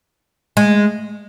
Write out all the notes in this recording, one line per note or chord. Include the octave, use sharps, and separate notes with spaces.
G#3